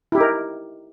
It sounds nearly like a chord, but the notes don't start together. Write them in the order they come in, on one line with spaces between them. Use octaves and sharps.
E4 G4 D#4 A#4